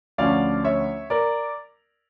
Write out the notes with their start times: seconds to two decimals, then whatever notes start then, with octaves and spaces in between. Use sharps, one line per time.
0.18 D2 D3 F3 C#4 D5 F5
0.64 C#5 E5
1.10 A#4 D5